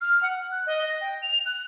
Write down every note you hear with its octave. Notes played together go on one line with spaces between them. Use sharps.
F6
F#5
F#6
D#5
A#6
G5
F7
F#6